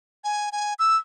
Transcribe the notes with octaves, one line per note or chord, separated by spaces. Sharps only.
G#5
G#5
E6